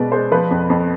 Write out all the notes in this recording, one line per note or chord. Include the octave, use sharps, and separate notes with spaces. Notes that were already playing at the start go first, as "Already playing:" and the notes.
Already playing: B2 G#3 B4 D5
G#3 C5
F3 B4
F2
F2